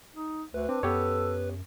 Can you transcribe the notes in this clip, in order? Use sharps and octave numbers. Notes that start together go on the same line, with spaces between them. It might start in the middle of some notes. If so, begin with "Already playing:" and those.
D#4
D2 B4
C4 D4
F#2 B3 G4 A4 C#5